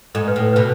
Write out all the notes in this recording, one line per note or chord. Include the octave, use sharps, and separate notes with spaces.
G#2 A4
B4
A2 A4
B2 B4